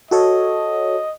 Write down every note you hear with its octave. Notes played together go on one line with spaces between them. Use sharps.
F#4 A4 C#5 D#5